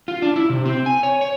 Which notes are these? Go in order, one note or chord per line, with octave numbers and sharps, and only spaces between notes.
F4
D4
E4
C3
C4
G#5
C#5
C#5